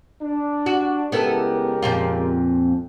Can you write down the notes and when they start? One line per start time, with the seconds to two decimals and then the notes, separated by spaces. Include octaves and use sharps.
0.22 D4
0.66 F#4
1.12 C#2 B3 E4 G4 A4 A#4
1.83 F2 A#2 F4